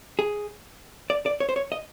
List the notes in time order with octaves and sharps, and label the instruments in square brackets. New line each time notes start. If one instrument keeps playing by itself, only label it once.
[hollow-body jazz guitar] G#4
D5
D5
C#5
C5
C#5
D#5